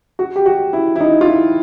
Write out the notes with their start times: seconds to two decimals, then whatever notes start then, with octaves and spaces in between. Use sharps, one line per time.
0.19 F#4
0.36 G4
0.46 F#4
0.73 E4
0.96 E4
1.01 D#4
1.21 F4
1.28 E4